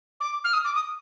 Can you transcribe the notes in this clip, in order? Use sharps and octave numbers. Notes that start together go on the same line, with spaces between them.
D6
F6
D#6
D6
D#6